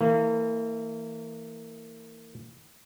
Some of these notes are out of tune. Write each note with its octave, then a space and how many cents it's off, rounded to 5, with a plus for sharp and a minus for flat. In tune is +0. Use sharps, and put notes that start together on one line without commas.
E3 -15 A#3 -35